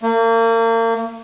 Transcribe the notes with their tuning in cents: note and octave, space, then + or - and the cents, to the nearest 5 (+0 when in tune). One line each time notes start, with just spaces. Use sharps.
A#3 -35